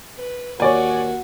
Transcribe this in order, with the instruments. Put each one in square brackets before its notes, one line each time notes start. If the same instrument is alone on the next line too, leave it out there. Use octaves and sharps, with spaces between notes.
[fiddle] B4
[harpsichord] D#2 [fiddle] F#4 [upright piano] C#5 D5 G#5